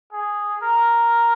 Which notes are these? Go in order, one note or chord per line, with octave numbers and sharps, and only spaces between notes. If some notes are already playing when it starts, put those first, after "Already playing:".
G#4
A#4